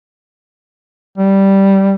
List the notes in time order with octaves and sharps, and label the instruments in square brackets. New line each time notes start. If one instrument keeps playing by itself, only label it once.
[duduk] G3